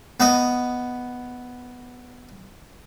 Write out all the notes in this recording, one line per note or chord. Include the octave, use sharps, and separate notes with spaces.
B3 D#5